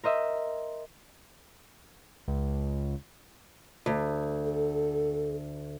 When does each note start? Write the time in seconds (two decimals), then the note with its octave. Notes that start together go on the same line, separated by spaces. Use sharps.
0.04 A#4 C5 D#5 E5
2.28 C#2
3.86 D2
4.46 A4